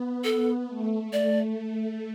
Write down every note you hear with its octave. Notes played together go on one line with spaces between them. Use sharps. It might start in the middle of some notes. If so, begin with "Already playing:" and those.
Already playing: B3
A4
A3
A3 D5
A3